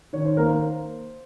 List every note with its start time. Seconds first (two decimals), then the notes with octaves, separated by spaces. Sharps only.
0.13 D#3 C#5
0.25 C5
0.37 A#3 A#4
0.48 C5